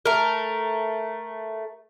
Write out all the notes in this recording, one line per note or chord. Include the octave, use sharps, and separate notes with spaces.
A3 A#4